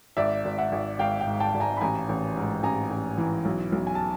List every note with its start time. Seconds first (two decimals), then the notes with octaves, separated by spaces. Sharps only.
0.17 G#1 D5 E5
0.45 G#1
0.58 E5 F#5
0.72 G#1
0.99 G#1 F5 G5
1.20 F5 G5
1.27 G#2
1.40 G5 A5
1.54 G#1
1.60 G#5 A#5
1.77 B5
1.81 A1 G#5 A#5
2.09 A1
2.36 G#2
2.63 A1 G#5 A#5
2.90 A1
3.18 E3
3.45 B1
3.72 B1
3.87 G#5
3.95 A5